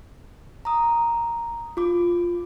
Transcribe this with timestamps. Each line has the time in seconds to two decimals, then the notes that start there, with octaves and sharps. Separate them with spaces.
0.65 A#5 D#6
1.77 F4 D6